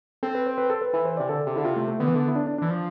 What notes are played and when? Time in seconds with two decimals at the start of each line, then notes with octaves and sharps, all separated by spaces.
0.23 C4 A4
0.35 B4
0.47 C5
0.58 B4
0.70 A4
0.81 B4
0.93 E3 B4
1.05 C5
1.17 C3 D5
1.29 D3 A4
1.47 C3
1.56 D3 E4
1.64 C3 F4
1.76 A3
1.88 A3
2.00 D3 B3
2.07 E3
2.15 D3
2.28 E4
2.35 D4
2.47 D4
2.58 E3 D4
2.70 F3